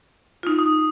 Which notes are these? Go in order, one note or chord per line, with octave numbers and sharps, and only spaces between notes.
D#4 F4
D#6